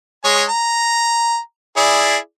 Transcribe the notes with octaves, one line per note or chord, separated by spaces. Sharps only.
G#3 C#5 G#5
A#5
E4 G#4 D5